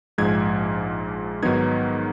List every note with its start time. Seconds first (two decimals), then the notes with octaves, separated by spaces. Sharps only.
0.18 A#1 G#2 F3 G#3 G#6
1.43 G#2 D#3 F#3 B3 D#4 G#6